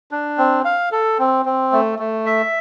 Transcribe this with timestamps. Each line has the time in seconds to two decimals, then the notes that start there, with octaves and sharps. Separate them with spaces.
0.11 D4
0.38 C4
0.65 F5
0.92 A4
1.19 C4
1.45 C4
1.72 A3
1.99 A3
2.26 E5